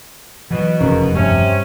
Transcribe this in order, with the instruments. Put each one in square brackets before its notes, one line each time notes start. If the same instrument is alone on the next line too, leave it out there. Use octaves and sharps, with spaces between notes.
[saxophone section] B2 [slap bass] E3 F#3
[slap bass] F1 E2 [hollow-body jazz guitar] C#3 [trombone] A#4
[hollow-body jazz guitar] G2 [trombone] C3 [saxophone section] C#4